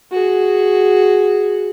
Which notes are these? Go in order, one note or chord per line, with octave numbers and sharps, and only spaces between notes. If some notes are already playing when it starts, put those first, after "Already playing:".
F#4 G#4